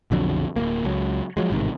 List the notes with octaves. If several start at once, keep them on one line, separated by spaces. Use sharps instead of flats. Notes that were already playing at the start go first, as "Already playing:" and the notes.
B1 F2 D3 F#3
D1 G1 A#3
C#2 F#3
F3 F#3 G#3
A1 G#2 C3 D#3